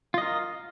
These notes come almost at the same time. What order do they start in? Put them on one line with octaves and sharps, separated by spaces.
F4 D#5 A#4